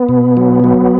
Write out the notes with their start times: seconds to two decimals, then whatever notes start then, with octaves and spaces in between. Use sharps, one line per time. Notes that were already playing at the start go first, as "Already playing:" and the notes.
Already playing: B3
0.09 B2
0.37 F#3
0.64 F#3